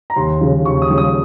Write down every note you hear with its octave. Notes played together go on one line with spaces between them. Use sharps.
A#5
D#2 C6
C#3 F3
D#2 C#6
D#6
C#3 F3
D#6